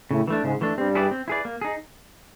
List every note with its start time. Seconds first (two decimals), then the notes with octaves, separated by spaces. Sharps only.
0.11 A2 C#3 A3
0.28 E3 A3 D4
0.44 G#2 C#3 G#3
0.61 E3 A3 D4
0.77 G2 G3 C4
0.95 E4 G#4 B4 D5
1.11 C4
1.28 E4 G#4 B4 D5
1.45 A#3
1.61 D#4 G#4